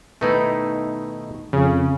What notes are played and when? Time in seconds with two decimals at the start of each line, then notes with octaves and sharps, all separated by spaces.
0.21 B2 D#3 A3 D#4 E4 B4
1.53 F2 C#3